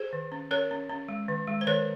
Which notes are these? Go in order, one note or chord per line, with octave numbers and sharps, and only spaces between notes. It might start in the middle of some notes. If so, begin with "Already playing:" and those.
Already playing: G#4 C5
D#3
C#4
C#4 A#4 C#5
C#4
C#4
G#3
D#3
G#3
C5
D#3 A#4 C#5